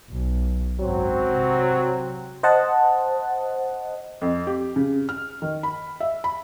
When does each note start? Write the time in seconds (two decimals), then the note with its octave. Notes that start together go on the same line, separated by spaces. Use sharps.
0.10 B1
0.80 G#1 F#2 F#3 C4
1.34 C3
2.43 C5 D#5 F#5 A5
4.21 F2
4.47 G4
4.76 C#3
5.09 F6
5.42 D#3
5.63 B5
6.00 E5
6.24 B5